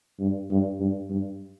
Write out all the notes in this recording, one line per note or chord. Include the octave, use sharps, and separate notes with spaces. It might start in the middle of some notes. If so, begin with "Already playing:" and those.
G2
G2
G2
G2